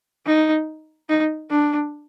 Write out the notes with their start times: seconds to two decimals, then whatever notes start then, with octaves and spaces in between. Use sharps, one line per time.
0.26 D#4
1.09 D#4
1.51 D4